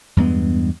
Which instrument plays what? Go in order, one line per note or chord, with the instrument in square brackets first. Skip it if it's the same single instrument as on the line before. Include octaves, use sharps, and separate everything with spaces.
[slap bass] E2 G2 G#3 B3